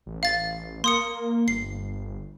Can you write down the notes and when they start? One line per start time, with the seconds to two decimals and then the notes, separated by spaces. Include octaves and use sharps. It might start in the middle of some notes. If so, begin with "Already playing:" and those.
0.06 A1
0.23 F5 A6
0.84 A#3 C6 D#6 C#7
1.48 G1 C7